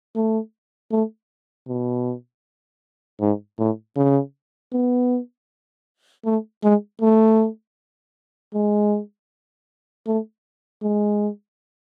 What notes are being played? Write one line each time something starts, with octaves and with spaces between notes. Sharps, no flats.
A3
A3
B2
G#2
A2
C#3
B3
A3
G#3
A3
G#3
A3
G#3